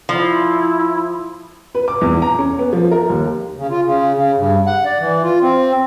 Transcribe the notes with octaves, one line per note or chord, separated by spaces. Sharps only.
F3 E4
B4
D6
E2
A#5
C#4
B3
F3
A#4
D#2
C#3
F4
C#3
C#3
G2
F#5
D5
E3
F4
C4